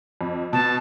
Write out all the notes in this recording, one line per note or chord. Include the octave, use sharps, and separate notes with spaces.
F2
B2 A5